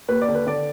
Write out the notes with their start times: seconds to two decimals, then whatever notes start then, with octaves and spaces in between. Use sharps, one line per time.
0.08 D#2 B4
0.22 D5
0.28 D3
0.35 B4
0.47 D3 D5